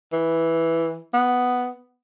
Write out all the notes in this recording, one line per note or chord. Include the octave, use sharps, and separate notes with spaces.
E3
B3